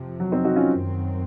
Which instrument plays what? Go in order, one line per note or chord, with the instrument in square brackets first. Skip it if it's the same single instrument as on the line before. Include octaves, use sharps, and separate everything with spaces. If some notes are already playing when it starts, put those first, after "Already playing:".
Already playing: [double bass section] F2 C3 F3
[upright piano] F#3
C4 D#4
D#4 F#4
C#4 F4
[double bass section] F#2 D#3 F#3 C4